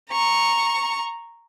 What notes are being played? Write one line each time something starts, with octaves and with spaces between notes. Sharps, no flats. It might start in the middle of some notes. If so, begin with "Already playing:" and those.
A#5 C#6